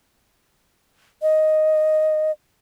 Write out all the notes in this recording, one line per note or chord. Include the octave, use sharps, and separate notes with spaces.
D#5